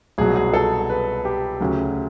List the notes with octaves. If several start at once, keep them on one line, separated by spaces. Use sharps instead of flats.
C2 B2 F#3 G#4
G#4
A4
B4
G4
D2 C#3 F#3